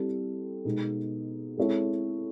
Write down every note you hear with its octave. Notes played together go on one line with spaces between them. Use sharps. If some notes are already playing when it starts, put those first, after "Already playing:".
Already playing: G3 C4 E4 A4
B2 G#3 B3 D#4
G#3 C4 E4 A4 C#5